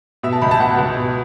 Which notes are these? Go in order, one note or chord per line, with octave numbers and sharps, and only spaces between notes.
B2 E5
A5
C#2 B5
A5
B2 F#5
C#2
B2